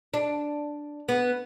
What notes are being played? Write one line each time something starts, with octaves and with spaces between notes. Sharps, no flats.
D4
B3